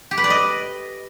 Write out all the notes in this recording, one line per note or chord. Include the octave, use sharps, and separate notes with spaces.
G4
B4
D5
D#5